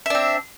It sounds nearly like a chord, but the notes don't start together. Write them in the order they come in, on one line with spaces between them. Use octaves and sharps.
E5 D4 C4